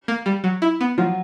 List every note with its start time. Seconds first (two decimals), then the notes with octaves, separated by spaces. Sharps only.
0.08 A#3
0.26 G3
0.44 F#3
0.62 E4
0.81 B3
0.98 F3 F#3